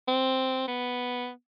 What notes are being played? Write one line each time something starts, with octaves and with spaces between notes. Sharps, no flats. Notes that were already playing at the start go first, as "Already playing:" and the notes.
C4
B3